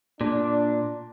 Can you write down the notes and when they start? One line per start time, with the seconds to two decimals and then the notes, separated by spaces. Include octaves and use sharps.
0.21 A#2 D4